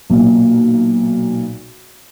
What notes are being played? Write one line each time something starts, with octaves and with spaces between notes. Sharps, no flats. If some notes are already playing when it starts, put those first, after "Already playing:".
B1 A#2